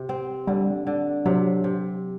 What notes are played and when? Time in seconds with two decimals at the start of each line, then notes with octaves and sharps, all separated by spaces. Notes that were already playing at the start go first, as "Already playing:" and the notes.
Already playing: C3
0.09 C4
0.47 D3 G3
0.87 D3
1.26 C3 F#3
1.64 C3